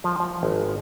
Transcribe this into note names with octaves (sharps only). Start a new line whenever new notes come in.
F3
F3
G#1